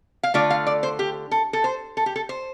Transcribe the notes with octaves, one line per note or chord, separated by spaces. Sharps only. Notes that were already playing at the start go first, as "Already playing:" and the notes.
F5
D3 A3 F4 D5
F5
D5
C5
G4
A4
A4
C5
A4
G4
A4
C5